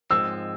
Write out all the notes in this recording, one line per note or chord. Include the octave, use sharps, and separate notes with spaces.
G#2 F3 G#3 C4 E6